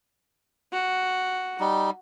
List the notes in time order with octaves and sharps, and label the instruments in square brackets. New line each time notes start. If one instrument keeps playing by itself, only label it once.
[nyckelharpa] F#4
[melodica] G3 D#4